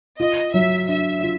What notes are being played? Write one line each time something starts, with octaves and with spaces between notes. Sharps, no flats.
F4 D#5
F#3 E5
D4 E5
F4